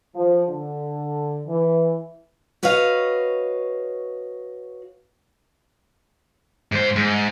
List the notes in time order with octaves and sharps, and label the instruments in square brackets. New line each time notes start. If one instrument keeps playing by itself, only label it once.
[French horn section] F3
D3
E3
[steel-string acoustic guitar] F#4 B4 C#5 D#5 F5
[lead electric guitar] G#2 C5
G#2